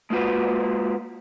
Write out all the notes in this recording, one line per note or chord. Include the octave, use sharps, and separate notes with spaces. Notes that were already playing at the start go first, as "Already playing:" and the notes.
G#3 A#3 F4 F#4 B4